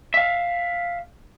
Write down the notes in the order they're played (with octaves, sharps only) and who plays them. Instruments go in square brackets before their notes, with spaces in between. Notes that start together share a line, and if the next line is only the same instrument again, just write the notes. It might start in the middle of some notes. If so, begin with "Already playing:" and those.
[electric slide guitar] E5 F5